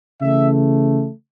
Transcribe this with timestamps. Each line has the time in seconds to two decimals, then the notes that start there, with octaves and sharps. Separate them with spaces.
0.21 C#3 E3 A3 E5